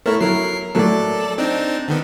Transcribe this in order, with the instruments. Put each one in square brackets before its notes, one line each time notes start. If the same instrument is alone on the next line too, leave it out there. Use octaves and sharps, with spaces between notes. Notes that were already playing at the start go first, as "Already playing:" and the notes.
[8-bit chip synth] A3 E4 [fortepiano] A4 A#4 C#5
[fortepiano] F#3 E4 [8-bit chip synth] A#4 C7
[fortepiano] A2 F#3 A#3 [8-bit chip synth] A4 D5
[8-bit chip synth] C4 D4 D#4
D3 D#3 B3